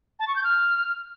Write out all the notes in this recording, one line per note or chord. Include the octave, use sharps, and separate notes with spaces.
A5
C#6
G6
F6